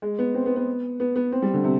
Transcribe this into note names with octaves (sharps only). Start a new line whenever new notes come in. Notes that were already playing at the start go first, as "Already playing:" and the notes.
G#3
B3
C4
B3
B3
B3
B3
C4
G3
D3
C3